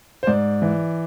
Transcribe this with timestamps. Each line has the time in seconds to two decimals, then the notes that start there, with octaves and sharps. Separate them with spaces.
0.23 C5
0.27 G#2 D5
0.62 E3